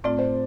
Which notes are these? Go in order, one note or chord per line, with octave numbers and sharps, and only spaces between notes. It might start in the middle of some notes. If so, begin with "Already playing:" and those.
A2 A3 C4 F4 D5
C5